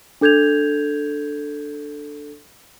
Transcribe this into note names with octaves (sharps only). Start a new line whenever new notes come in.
D4 A4 G6 G#6 F7